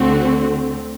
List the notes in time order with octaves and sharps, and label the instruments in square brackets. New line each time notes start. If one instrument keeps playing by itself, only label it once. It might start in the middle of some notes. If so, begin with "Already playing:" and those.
Already playing: [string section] D2 D3 A3 C4 F#4